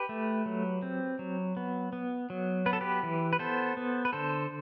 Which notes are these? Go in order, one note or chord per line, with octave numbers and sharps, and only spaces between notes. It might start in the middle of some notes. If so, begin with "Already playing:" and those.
Already playing: G4 B4
A3
F#3
C4
F#3
B3
B3
F#3
B3 B4
A4
G4 B4
E3
B4
B3 A4 C5
B3
B4
D3 A4 C5